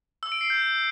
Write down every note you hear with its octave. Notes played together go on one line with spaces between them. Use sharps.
E6
D7
C7
G6